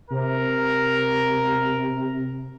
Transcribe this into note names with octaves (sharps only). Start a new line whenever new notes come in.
C3 A#4